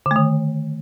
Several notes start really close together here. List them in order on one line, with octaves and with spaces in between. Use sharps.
D3 A3 D#3